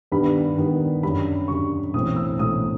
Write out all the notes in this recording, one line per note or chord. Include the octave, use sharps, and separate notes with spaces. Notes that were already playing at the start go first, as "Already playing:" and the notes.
G2 D#3 G3 B3 B5
G2 D#3 G3 B3
F#2 D3 G3 B5
F#2 D3 G3 C#6
B1 A2 E3 A3 C4 D#6
E6
B1 A2 E3 A3 C4 D#6